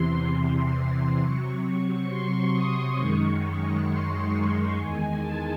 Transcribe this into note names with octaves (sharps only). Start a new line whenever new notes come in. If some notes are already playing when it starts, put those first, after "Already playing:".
Already playing: E2 C3 E3 C6
C6
C3 F#3 C#6
C6
D#6
F#2 D#3 G#3 C#6
C6
C6
E2 D#3 G#3 G#5
A5